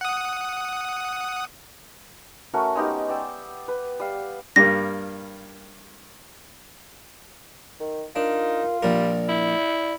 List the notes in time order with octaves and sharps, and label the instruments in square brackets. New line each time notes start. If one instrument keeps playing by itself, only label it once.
[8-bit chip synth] F#5 D#6
[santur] A3 C#4 F#4 A#4
G#3 B3 D#4 G4
D5 G5 E6
B4
G3 F5
[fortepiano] G2 G3 A#3 [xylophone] A#6
[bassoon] D#3
[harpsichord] D4 [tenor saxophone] D#4 [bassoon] F4 [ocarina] A#4
[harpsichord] A#1 A#4 [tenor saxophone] G3 [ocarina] D5
[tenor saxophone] E4